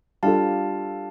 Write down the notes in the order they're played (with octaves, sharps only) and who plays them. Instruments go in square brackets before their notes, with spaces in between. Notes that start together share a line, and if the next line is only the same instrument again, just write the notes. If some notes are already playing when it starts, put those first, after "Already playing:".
[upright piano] G3 D4 F4 A4 [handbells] F5 A5